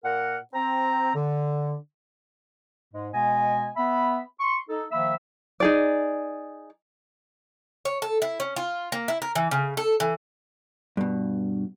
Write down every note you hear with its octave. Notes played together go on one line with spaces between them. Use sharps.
A#2 A#4 F#5
C4 A#5
D3
G#2 G#3
B2 G#3 B3 D#5 G#5
B3 E5 B5
C6 C#6
D#4 A4
D#3 F3 A#3 E5 B5 E6
D#4 G#4 D5
C#5
A4
E4
C#4
F4
A#3
E4
A#4
E3
C#3
A4
E3
G2 B2